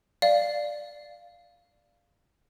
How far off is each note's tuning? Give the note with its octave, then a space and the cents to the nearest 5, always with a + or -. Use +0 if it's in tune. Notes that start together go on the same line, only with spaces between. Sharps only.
D5 +5 F5 +0